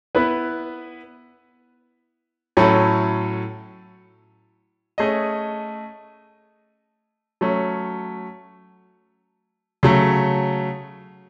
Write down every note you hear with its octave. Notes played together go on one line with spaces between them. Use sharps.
B3 E4 B4
A2 F#3 C#4 E4 A4
A3 C#4 G#4 D#5
F#3 A3 C#4
C#3 F#3 A3